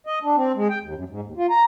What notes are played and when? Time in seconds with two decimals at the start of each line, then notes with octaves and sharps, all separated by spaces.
0.07 D#5
0.23 D4
0.36 C4
0.56 G#3
0.70 G5
0.82 D#2
0.94 F#2
1.10 G#2
1.24 D#2
1.37 F4
1.50 A#5